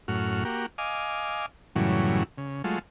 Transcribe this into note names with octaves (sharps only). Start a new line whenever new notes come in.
F#2 A2 F#4 F6
A#3 F#4 G4
D#5 F5 G#5 D6
F#2 A2 C#3 E3 F#3 G3
C#3
F#3 G#3 A3 F4